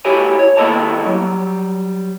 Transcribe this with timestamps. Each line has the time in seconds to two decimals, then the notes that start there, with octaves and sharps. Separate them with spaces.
0.05 E4 F#4 G4 A4 C#5 G#5
0.39 C#5
0.57 D#2 A#3 E4 A4 D#5 A5
1.06 F#3 G3